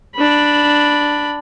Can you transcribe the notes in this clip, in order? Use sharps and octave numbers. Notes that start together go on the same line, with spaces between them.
D4 B5